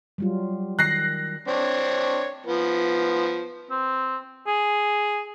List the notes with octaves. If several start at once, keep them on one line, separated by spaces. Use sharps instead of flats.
F#3 G3 F4
D#3 F#6 A#6 C7
C4 D4 C#5
F3 B3
C4
G#4